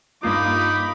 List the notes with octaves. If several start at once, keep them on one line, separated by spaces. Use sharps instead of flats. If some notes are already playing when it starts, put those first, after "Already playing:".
G2 A#3 D#4 F4 B5 D6